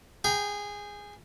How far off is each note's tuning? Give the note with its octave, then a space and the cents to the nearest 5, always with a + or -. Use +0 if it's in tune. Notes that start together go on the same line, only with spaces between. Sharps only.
G#4 -15 G5 +0 A#5 +35